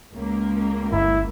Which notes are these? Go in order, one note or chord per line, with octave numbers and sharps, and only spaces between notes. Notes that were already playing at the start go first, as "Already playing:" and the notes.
C#2 A#3
G1 E4